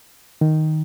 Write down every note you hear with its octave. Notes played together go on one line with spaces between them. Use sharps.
D#3